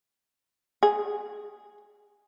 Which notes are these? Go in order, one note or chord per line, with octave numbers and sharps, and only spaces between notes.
G#4